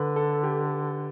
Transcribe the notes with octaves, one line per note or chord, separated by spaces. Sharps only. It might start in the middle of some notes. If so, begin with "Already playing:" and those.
Already playing: D3 B4
A4
G4